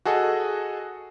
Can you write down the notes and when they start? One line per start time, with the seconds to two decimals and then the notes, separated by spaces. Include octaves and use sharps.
0.05 F#4 G#4 A4 D#5